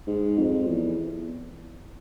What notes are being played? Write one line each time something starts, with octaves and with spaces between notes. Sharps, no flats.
G#2
F2
E2